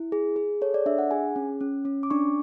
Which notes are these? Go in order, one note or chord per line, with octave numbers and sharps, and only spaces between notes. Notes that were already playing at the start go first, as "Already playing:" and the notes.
Already playing: E4
G#4
G#4
A4 C#5
D5
D4 E5
F#5
G#4 G#5
C#4
C#4
C#4
D6
D4 C#6